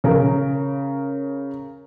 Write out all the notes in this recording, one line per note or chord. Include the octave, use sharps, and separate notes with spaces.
C#3 A#4